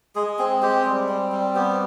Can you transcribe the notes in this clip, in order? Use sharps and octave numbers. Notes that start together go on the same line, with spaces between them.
G#3 G#4
C4 G#4
G#3 G4
G3
C4
G3
B3 G4